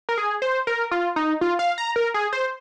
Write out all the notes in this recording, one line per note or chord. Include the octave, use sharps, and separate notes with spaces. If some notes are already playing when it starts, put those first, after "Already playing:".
A#4
G#4
C5
A#4
F4
D#4
F4
F5
A#5
A#4
G#4
C5